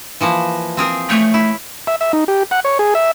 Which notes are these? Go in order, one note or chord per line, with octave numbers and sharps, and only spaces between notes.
E3 F3 A#3
C4 G#4 A#4
A3 C#5
E4
E5
E5
D#4
G4
F#5
C#5
G#4
E5